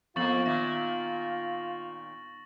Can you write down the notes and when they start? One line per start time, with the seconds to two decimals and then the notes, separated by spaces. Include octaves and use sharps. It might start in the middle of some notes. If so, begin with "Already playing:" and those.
0.16 F2 A#3 B3 F4 C#6 A6 F#7
0.46 A#2 D#3 E5 A#6